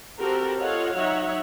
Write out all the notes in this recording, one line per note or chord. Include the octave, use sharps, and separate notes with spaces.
C4 F#4 G4 A4 A#4
F4 A4 C#5 D#5 F5 F#5
F#3 D#4 C#5 E5 F#5